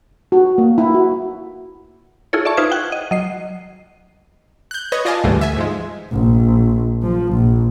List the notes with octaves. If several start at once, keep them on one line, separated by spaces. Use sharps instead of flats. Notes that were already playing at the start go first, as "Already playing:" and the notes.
F#4
A#3
E4
F#4
E4 F4 G#4 A4 C#5
D5 E5 A5 C#6
D#4 F4 B4 C5 E5 G#6
F#5 G5 F#6 G#6
D#5
F#3 D#5 C7
F#6 G6
B4 C#5 D#5 G#6 A#6
F4 D5 D#5 F5 G#5 A5
D2 G#2 D3 E3 G3 A3
E5 G#5
G#2 F3 G#3
A#1
F3
A#1